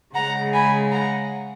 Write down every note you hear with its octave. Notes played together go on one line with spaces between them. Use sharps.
C#3 G#3 F#5 A#5
G#5 B5
F#5 A#5